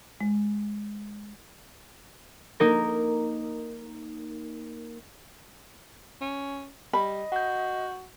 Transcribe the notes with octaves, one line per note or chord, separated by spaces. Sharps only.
G#3
A#3 D#4 A#4
C#4
G3 D#5 B5
F#4 F#5 G6